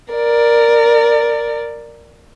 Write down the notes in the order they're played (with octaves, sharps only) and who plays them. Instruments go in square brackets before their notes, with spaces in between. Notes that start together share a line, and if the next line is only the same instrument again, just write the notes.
[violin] A#4 D5